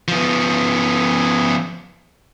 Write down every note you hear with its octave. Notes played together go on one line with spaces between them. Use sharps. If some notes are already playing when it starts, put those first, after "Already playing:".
F3 B3